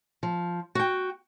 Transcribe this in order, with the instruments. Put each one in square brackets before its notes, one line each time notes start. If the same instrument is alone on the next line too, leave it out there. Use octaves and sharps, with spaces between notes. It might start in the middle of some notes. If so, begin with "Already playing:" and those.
[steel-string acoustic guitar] F3
F#4 G5